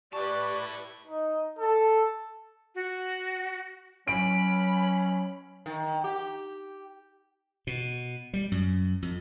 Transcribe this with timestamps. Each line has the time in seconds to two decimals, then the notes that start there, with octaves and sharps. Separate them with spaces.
0.13 E4 G4 B4 D5 A5 C#6
1.07 D#4
1.59 A4
2.75 F#4
4.08 F#3 C#4 B5 D7
5.66 D#3
6.04 G4
7.67 B2
8.34 G3
8.52 F#2
9.02 F2